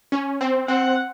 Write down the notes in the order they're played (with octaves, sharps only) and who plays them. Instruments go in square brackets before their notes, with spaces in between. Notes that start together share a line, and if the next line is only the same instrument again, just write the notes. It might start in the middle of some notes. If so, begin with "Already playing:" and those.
[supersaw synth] C#4
C4
[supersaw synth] C4 [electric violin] F#5